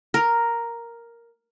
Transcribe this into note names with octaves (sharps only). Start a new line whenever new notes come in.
A#4